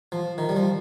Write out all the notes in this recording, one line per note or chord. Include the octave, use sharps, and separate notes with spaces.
F3
D#3
G3
F3